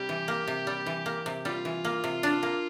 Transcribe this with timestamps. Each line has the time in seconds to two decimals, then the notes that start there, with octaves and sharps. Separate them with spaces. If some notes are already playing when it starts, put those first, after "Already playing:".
Already playing: C3 G3 G4
0.09 E3
0.28 A#3
0.48 C3
0.67 G3
0.86 E3
1.06 A#3
1.26 C3
1.45 G3 F4
1.65 E3
1.85 A#3
2.04 C3
2.23 D4
2.43 A#3